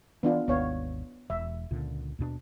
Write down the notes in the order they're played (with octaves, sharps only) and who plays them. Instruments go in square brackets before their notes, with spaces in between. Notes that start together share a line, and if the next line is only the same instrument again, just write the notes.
[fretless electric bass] E3 [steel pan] B3 D4 F4
[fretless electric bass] G#1 D#2 [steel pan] B3 C#5 F5
[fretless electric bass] E1 [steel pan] E5
[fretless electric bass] C#2 A#2 D3
D#2 B2 D4